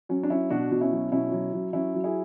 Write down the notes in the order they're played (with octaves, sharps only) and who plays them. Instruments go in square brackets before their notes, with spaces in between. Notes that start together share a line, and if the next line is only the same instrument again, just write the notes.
[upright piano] F#3 C#4
D4
F#3 C#4 E4
B2 D4 F#4
B2
C#4 E4
F#3
B2 C#4 E4
F#3
F#3
F#3 C#4 E4
F#3
E4 G#4